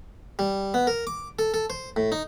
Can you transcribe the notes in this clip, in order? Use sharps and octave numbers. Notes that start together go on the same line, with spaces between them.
G3
B3
A#4
D6
A4
A4
C5
A2
D#4